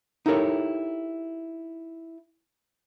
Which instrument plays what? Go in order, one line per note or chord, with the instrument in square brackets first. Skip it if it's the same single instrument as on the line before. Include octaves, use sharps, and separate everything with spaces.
[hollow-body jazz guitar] D#4 E4 G4 A4 A#4 C#5